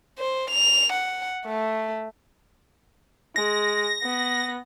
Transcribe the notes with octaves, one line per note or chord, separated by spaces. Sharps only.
C5
F7
F#5
A3
G#3 A#6
B3